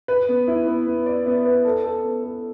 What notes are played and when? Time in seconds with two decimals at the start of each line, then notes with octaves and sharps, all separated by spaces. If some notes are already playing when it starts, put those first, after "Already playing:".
0.08 B4
0.28 B3
0.48 E4
0.67 B3
0.87 B3
1.06 D5
1.26 B3
1.45 B4
1.65 A4
1.85 A4
2.04 B3
2.23 A4